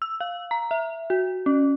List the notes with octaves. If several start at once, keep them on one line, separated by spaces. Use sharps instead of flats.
E6
F5
A#5
E5
F#4
C#4